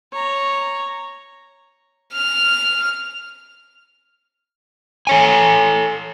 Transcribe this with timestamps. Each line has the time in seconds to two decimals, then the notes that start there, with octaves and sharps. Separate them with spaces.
0.12 C#5 A#5
2.13 F6
5.07 A4 C#5 G#5